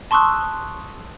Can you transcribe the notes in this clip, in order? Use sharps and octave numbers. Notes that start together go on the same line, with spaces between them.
A5 C6 C#6 D#6 E6 F#6